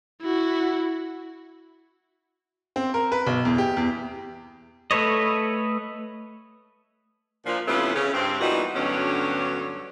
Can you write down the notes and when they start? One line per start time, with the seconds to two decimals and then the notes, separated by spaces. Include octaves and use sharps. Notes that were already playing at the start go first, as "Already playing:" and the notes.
0.22 E4 F#4
2.76 C4
2.94 A#4
3.12 B4
3.27 B1
3.45 E2
3.58 G4
3.77 E2
4.91 A3 A4 B4 C#5 D#5
7.46 A#2 F3 D4
7.68 C3 E3 A3 B3 C#4 F4
7.95 C#3 C#4
8.13 G2 C4 C#4
8.41 A#2 E3 G3 B3 D#4 F#4
8.75 D2 G2 D3 F#3 B3 C#4